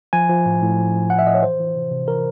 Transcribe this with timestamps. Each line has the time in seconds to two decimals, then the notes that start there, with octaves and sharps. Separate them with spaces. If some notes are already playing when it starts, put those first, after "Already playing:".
0.13 F3 G#5
0.29 F3
0.46 A2
0.62 A2
0.78 F3
0.94 F3
1.10 A2 F#5
1.19 E5
1.27 A2 D#5
1.34 C#5
1.43 E3 C5
1.59 E3
1.75 C3
1.91 C3
2.08 E3 A#4